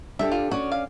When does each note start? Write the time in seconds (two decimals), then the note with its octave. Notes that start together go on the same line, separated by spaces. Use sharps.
0.19 D4 G4 A4 E5
0.32 F4
0.51 C#4 F#4 D5
0.72 F5